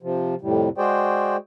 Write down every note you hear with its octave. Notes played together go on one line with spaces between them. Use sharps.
C3 F3
F2 A2 C3 G3
G#3 F#4 G#4 C5 D5 G5